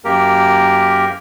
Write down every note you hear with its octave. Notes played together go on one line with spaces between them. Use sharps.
F#2 A#3 G4 A#4